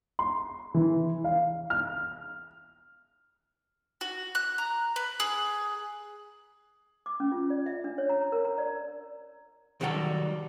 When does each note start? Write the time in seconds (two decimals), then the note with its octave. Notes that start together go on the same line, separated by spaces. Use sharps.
0.19 C6
0.74 E3
1.24 F5
1.70 F6
4.01 F#4
4.35 F#6
4.58 A#5
4.96 B4
5.20 G#4
7.06 D6
7.20 C#4
7.32 F4
7.50 D5
7.66 E5
7.84 D4
7.98 C#5
8.09 A#5
8.32 A#4
8.45 A#5
8.58 D5
9.81 D#3 F#3 G3 F#4 A4